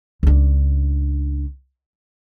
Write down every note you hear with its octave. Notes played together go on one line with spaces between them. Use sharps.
C#2 D4